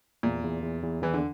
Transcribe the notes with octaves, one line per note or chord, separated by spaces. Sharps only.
E2 A#2
E2
E2
E2
E2 E3
D3